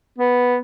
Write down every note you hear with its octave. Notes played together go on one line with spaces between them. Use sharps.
B3